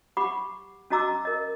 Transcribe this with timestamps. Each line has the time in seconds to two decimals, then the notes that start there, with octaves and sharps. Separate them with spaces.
0.17 G4 F#5 B5 C#6 D6
0.90 C#4 F#4 D#5 A#5 D6 E6
1.25 A#4 D#5